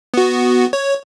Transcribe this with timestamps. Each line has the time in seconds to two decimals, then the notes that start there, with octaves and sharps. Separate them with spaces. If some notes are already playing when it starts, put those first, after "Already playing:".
0.14 B3 F#4
0.73 C#5